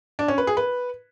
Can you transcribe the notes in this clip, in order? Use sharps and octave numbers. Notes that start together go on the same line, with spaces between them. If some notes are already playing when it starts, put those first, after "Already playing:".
D4
C#4
B4
G#4
B4